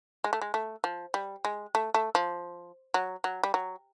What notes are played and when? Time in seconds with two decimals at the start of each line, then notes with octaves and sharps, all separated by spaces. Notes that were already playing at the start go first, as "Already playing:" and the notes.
0.24 G#3
0.33 A3
0.42 G#3
0.54 A3
0.84 F3
1.14 G3
1.45 G#3
1.75 A3
1.94 A3
2.15 F3
2.94 F#3
3.24 F#3
3.43 G3
3.54 F#3